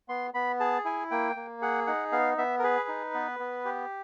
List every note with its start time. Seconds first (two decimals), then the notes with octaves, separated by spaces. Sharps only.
0.08 B3 C6
0.34 B3 B5
0.60 G#4 A5
0.85 E4 G#5
1.11 A#3 G5
1.36 A#3
1.62 G#4 F#5
1.87 D#4 F#5
2.12 B3 F5
2.38 B3 E5
2.59 A#4
2.63 G#4 B4
2.88 D#4
3.14 B3
3.40 B3
3.65 G4